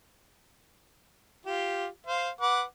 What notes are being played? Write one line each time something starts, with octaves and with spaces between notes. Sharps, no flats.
F4 G4
C5 F5
B4 F#5 D6